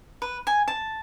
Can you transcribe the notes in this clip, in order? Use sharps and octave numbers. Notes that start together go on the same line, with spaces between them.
B4
G#5
A5